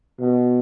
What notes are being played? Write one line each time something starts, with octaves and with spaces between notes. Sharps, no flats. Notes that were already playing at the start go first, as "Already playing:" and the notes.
B2